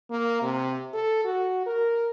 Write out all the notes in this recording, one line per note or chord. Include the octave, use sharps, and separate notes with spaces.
A#3
C3
A4
F#4
A#4